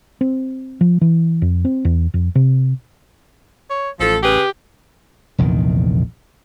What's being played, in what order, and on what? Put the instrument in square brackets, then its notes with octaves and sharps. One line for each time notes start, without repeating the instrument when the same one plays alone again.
[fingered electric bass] C4
F3
E3
F2
C4
E2
F2
C3
[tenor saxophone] C#5
[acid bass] A1 [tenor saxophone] F3 [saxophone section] A4
[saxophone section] C#3 G#4 B4 [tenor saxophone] G4
[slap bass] F1 A#1 E2 D#3